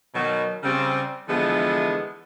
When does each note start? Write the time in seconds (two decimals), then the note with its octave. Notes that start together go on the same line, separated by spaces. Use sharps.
0.14 B2 D#3 F#3
0.63 C#3 G3 C4
1.28 D3 E3 F3 G#3 A3 B3